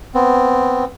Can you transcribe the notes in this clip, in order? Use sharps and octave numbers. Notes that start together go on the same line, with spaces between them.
B3 C4